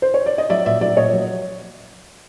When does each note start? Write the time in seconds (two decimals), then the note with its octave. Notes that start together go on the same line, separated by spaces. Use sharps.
0.02 C5
0.14 C#5
0.26 D5
0.38 D#5
0.50 F#3 D5 E5
0.66 A#2 D5 E5
0.81 F#3 D5 E5
0.97 A#2 C#5 D#5
1.13 F#3